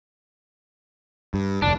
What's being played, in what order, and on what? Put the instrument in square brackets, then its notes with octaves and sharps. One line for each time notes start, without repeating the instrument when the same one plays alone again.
[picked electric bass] G2
[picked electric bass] F1 D2 [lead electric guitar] D4